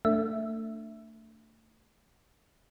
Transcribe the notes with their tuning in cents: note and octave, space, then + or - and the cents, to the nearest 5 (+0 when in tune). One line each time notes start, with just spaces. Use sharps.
A3 +25 D4 +0 E5 +0